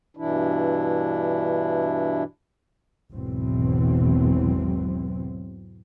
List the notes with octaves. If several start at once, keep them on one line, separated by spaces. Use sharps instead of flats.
G2 B2 E3 D4 E4
G#1 E2 B2 E3 F#3 C4